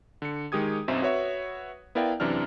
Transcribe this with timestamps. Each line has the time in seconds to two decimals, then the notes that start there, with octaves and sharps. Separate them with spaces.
0.22 D3 C#7
0.52 D#3 G#3 G4 D#6 G#6
0.88 B1 F#2 C4 E5
1.02 F#4 B4 C#5 E5
1.95 B3 E4 A#4 D5 F5 G5
2.20 F#2 C3 E3 D4 F6